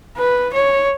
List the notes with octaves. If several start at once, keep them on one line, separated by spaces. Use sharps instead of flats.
B4
C#5